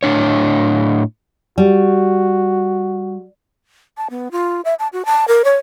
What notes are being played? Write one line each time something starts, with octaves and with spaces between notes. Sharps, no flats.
A2 D4 C#5
G3 F#4
A5
B3
F4
E5
A5
F#4
A5
A#4
C#5